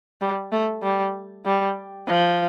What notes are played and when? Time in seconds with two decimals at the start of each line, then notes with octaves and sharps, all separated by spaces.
0.21 G3
0.52 A3
0.83 G3
1.45 G3
2.07 F3